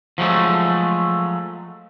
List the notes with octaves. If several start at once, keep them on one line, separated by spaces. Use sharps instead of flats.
F3 F#3 G#3 A3